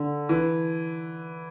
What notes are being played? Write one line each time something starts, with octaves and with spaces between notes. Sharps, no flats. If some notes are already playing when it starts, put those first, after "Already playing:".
Already playing: D3
E3